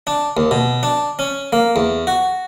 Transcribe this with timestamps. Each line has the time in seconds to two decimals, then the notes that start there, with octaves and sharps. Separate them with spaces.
0.07 D4
0.37 D#2
0.51 B2
0.83 D4
1.19 C#4
1.53 A#3
1.76 E2
2.07 F#4